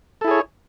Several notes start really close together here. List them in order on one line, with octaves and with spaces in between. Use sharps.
A4 E4 G#4 C#5